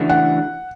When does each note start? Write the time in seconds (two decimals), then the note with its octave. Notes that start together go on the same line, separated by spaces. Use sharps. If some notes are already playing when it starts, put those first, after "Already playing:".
Already playing: C#3 E3 A3 D4 F#4
0.09 F#5